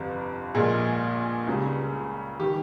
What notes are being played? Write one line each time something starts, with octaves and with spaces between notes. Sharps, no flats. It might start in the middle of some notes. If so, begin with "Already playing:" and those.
Already playing: G1 F2 C3
A#1 A#2 G#3 G#4
C#2 C#3 G3
D#3 G3 G4